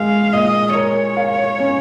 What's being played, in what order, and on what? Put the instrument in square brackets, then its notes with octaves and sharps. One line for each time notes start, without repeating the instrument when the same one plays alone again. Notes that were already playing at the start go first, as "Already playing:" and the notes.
Already playing: [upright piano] G#3 [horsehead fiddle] F5
[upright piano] A#2 [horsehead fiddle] D#5
[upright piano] A#4 [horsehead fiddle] C#5
[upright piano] F5
C#4